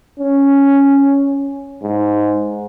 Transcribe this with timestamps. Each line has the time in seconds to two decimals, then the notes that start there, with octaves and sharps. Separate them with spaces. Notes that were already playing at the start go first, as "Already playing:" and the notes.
0.19 C#4
1.83 G#2